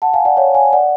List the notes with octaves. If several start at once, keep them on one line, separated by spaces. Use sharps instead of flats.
F#5 A5
F5 G#5
D5 F#5
C#5 F5
F5 G#5
D5 F#5